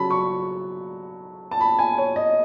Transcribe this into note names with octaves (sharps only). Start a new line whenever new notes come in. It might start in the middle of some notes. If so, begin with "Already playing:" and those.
Already playing: C#3 F#3 A5 B5
C#6
A5
B5
G#5
C#5
D#5